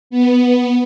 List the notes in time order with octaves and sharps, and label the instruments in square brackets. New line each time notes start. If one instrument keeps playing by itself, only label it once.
[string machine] B3